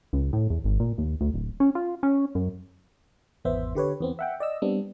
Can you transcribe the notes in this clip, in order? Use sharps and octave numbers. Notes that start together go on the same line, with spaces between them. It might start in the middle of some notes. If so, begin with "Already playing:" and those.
C#2
A2
E2
G#1
A#2
D#2
D2
D1
C#4
F4
C#4
F#2
G#1 E2 B3 C5 E5
D3 G4 B4 C#5
E2 B3 C4
E5 F#5 G5
D5 D#5 E6
G3 B3 C4 D4